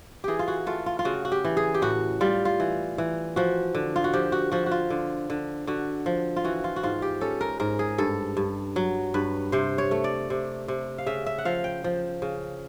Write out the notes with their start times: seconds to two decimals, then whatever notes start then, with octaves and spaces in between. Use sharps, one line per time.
0.24 E3 G4 G#4
0.39 F4
0.48 F#4
0.67 A3 F4
0.86 F4
0.99 F4
1.05 C#3 F#4
1.25 F#4
1.32 G4
1.45 E3
1.57 G#4
1.74 G4
1.82 A2 F#4
2.21 G3 F4
2.45 F4
2.60 E3
2.98 E3
3.36 F3 F#4
3.75 D3
3.96 F4
4.04 F#4
4.13 F3 G4
4.32 F#4
4.52 F3 F#4
4.66 F#4
4.72 F4
4.90 D3
5.30 D3
5.67 D3 F#4
6.06 F3
6.36 F4
6.44 E3 F#4
6.64 F4
6.76 F#4
6.83 G#2 F4
7.02 G4
7.21 C#4 A4
7.41 A#4
7.60 G#2 A#4
7.79 G#4
7.98 G2 A4
8.37 G2
8.76 F#3
9.14 G2 B4
9.52 C3 C5
9.78 C#5
9.91 A3
10.04 D5
10.30 C3
10.68 C3
10.98 F5
11.06 C#3 E5
11.26 E5
11.38 F#5
11.45 F3 F5
11.64 G5
11.84 F3
12.22 C#3